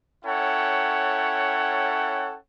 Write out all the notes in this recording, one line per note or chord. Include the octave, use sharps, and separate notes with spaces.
C#4 E4 A4 C#5 F#5 G5